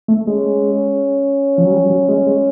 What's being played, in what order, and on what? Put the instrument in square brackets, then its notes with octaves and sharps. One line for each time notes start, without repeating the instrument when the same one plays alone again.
[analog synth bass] A3
[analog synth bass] G#3 [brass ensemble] C#4
[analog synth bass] F3
F#3
G3
F#3
G#3
G#3